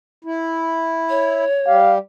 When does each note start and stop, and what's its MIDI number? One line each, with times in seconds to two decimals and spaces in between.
0.25 1.45 64
1.10 1.77 73
1.67 1.98 55
1.67 1.98 67
1.67 1.95 77